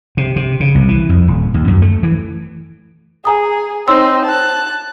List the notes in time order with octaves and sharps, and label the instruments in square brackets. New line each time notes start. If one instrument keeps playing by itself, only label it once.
[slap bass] C3
C3
C#3
C2
E3
F2
D#1
D#2
F#2
A3
E3
[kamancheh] G#4 [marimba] G#5 A#5 D#6
[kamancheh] C4 D#4 [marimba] C#5 C6 E6
[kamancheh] A5 F#6